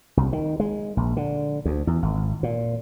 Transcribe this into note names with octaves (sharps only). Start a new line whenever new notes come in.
C2
D#3
G#3
A#1
D3
D2
E2
G#1
A#2